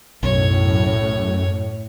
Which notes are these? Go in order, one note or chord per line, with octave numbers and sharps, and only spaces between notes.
B1 F#2 A2 C#5